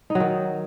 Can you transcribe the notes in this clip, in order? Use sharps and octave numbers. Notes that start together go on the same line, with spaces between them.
D#4
F#3
D#3